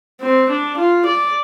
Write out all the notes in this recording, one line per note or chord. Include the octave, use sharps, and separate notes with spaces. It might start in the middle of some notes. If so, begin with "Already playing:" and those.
C4
D4
F4
D5